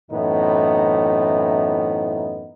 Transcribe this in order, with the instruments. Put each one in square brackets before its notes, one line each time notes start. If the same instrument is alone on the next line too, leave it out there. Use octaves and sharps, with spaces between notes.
[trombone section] F#2 A2 E3 B3 C4 D#4